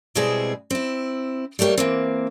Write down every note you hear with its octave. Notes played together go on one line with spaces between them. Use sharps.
B2 G3 G#3 C4 E4 G#4
C4 E4
G3 A3 A#3 G4 C#5
E3 A#3 C4